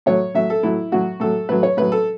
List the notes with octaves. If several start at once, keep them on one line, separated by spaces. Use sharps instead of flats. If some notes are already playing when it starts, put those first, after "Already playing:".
A2 F#3 C#5
A2 F#3 E5
A4
A2 F#3 E4
A2 F#3 F#4
A2 F#3 A4
A2 F#3 B4
C#5
A2 F#3 B4
A4